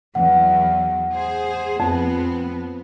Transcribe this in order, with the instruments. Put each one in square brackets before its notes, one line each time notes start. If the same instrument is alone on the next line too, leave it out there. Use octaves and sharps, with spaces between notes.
[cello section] E2 F#3 [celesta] F#5
[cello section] G#4 C5
[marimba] F2 [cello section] F3 B3 C4